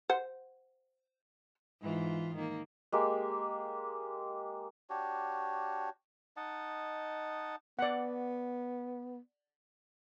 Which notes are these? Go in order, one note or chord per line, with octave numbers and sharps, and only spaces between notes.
C5 F#5
G#2 E3 F4
D#3 A#3
G#3 A#3 G4
D4 F#4 G4 C#5
D#4 D#5 F#5 A5
B3 D5 F#5